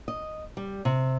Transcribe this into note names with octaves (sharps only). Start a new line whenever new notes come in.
D#5
G3
C3